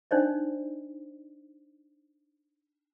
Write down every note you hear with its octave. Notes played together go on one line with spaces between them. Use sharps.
D4 D#4 C5 D5 D#5